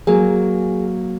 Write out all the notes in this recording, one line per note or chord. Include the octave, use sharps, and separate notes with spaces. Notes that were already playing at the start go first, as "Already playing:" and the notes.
F#3 A#3 G#4